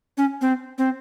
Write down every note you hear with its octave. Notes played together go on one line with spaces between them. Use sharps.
C#4
C4
C4